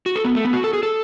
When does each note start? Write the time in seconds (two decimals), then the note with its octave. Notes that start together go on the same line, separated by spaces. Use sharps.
0.06 F#4
0.16 A4
0.25 B3
0.35 A3
0.45 B3
0.53 F#4
0.64 A4
0.73 G#4
0.83 A4